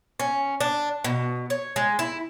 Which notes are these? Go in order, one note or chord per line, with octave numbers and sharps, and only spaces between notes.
C#4
D4
B2
C#5
G#3
E4